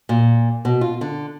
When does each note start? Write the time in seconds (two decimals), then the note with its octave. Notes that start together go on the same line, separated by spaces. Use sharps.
0.09 A#2
0.65 B2
0.81 F4
1.01 D3